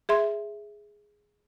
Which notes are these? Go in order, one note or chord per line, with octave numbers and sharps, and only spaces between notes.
G#4 E5 C6